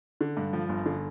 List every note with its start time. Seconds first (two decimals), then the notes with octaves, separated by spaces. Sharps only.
0.21 D3
0.37 G2
0.53 F3
0.69 G1
0.86 D3